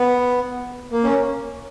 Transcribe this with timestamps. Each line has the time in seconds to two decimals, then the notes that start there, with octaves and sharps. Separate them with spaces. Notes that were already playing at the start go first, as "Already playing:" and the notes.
Already playing: B3
0.92 A#3
1.04 C#4